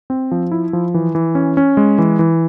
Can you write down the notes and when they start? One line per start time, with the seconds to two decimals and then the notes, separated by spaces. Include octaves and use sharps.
0.10 C4
0.31 F3
0.52 E4
0.73 F3
0.94 E3
1.15 E3
1.35 C#4
1.57 C#4
1.77 G#3
1.98 E3
2.19 E3